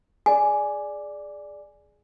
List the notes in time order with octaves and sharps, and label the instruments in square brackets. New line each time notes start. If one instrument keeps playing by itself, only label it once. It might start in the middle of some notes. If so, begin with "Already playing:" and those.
[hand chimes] G#4 D5 [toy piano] G#5